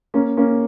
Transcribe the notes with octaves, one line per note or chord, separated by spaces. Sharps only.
A#3 C#4
A#3 C#4